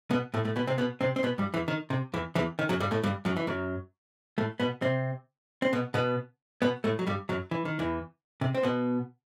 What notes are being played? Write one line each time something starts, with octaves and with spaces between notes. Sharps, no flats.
B2 B3
A2 A3
A2 A3
B2 B3
C3 C4
B2 B3
C3 C4
C4
B2 B3
G2 G3
E2 E3
D#3
C3
E2 E3
E2 E3
D#3
F#2 F#3
G2 G3
A2 A3
G2 G3
F#2 F#3
E3
F#2 F#3
A2 A3
B2 B3
C3 C4
C4
B2 B3
B2 B3
B2 B3
A2 A3
F#3
G2 G3
F#2 F#3
E3
D#3
E2 E3
C3
C4
B2 B3